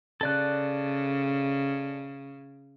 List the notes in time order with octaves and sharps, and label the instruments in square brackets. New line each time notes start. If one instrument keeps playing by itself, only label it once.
[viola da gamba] C#3 [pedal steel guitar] A4 D5 F#6